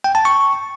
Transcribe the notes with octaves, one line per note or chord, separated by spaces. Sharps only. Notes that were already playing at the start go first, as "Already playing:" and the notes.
G5
A5
C#6